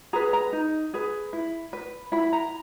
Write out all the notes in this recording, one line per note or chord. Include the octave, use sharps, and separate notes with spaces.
G#4 B4 A#5
A#5
D#4
G#4 B4
E4
B4
E4 B5
A#5